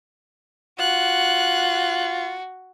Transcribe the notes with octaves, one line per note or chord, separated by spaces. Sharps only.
F4 F#4 F#6